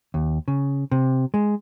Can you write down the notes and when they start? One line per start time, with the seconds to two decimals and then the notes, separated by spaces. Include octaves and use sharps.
0.14 D#2
0.48 C#3
0.91 C3
1.34 G#3